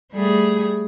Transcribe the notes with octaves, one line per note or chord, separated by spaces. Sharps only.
G3 A3 G#4